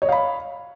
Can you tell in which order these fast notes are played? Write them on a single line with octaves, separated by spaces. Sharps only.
C#5 D#5 F5 B5